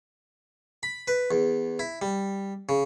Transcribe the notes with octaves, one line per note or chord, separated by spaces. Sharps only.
B5
B4
E2
E4
G3
C#3